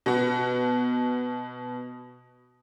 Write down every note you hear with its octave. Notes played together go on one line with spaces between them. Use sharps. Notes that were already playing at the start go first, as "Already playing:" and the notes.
B2 F#4